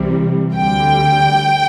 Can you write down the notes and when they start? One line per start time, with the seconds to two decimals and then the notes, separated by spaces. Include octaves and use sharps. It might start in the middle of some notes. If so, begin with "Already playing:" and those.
Already playing: C2 C3 E3 G3
0.54 D2 D3 G3 G5